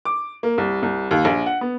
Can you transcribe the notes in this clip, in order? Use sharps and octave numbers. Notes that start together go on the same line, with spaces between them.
D6
A#3
C2
C2
D#2
A#1
F#5
B3